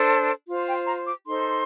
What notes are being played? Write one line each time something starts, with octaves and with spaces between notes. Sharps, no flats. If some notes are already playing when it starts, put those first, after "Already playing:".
Already playing: D4 A4 C5
F4 C5
G5
A#5
D6
D#4 A4 C5 C6